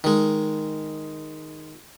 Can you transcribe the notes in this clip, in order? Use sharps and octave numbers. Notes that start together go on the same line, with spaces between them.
D#3 G#3